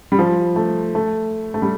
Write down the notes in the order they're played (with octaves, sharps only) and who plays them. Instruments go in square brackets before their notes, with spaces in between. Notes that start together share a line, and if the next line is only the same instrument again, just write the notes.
[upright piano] G3
F3
A3
A3
A3
G3